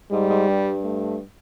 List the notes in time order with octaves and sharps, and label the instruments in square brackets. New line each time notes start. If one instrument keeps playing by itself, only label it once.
[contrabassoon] G#2 [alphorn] G3
[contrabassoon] G#2
G2
[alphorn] A3